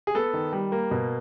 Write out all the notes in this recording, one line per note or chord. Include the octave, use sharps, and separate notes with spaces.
G#4
B3 A4
D#3
G3
A#3
B2